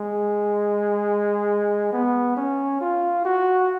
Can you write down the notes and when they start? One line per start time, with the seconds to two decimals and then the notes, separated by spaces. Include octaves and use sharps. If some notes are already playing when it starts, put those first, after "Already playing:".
Already playing: G#3
1.93 B3
2.37 C#4
2.81 F4
3.25 F#4